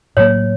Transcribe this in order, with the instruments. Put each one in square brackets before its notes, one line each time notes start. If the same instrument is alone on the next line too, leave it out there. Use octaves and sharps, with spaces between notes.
[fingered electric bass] A2 F#3 A#3 [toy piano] C#5